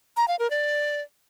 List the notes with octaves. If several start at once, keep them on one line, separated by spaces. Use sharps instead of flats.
A#5
F5
A#4
D5